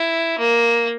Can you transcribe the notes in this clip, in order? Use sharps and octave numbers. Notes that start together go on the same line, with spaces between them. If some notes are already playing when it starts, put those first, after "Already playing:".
Already playing: E4
A#3